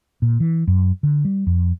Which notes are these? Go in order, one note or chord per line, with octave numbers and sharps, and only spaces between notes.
A#2
E3
F#2
D3
G3
F2